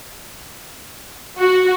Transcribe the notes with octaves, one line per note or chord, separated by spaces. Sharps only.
F#4